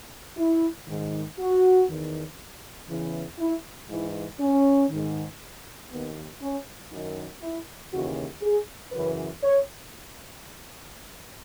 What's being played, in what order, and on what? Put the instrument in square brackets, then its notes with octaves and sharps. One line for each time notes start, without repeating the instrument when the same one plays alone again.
[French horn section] E4
G#2 D#3
F#4
E2 D#3
E2 C#3 E3
E4
G#2 E3 E4
C#4
G#2 D#3
D#2 D#3 B3
C#4
F#2 D#3 D#4
E4
D#2 C#3 E3 F#4
G#4
F#2 C#3 E3 B4
C#5